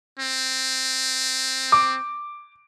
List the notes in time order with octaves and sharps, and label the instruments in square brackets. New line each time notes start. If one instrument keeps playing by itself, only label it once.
[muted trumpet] C4
[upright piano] D6